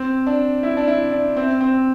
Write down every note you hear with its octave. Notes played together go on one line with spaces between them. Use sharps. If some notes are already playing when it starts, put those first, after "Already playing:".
Already playing: C4
D4
E4
D4
E4
D4
C4
C4